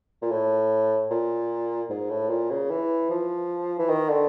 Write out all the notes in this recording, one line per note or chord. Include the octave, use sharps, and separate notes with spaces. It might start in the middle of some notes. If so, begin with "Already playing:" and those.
A#2
A2
A#2
G#2
A2
A#2
C#3
E3
F3
E3
D#3
D3